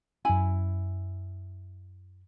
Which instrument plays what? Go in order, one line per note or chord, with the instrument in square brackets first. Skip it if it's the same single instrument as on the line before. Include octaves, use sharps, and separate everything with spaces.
[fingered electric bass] F#2 C#4 [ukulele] E4 G#5 B5